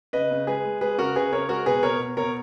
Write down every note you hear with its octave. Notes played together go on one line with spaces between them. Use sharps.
C#3 B4 D#5
C#3
G#3 G#4 B4
G#3
G#3 G#4 B4
C#3 F#4 A#4
C#3 G#4 B4
C#3 A#4 C#5
G#3 F#4 A#4
B2 G#4 B4
B2 A#4 C#5
B2
B2 A#4 C#5